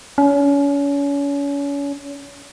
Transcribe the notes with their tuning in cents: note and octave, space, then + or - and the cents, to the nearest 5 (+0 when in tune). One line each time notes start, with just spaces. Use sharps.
C#4 +35